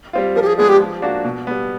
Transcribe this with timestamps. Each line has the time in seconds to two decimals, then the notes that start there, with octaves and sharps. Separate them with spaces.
0.13 G3 C4 F4
0.36 F3 A#4
0.42 G4
0.47 G#4
0.58 G#3 B3 D4 G#4
0.69 G4
0.80 F3
1.02 A#3 D4 F#4
1.25 B2
1.47 G3 B3